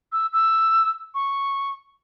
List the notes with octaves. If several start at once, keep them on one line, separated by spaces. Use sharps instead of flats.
E6
E6
C#6